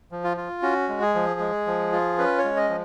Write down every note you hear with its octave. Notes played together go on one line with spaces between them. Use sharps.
F3
F4
F4
C#4 F#4
G#3
G#4
F3
G#3
F3
F4
C#4 B4
C#5
G#3
D#5
F3